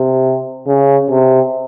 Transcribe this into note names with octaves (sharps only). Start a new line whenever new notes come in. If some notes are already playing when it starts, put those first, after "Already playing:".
Already playing: C3
C#3
C3